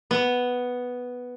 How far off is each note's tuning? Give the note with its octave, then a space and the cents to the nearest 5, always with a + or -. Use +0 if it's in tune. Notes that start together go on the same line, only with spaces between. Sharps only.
B3 +0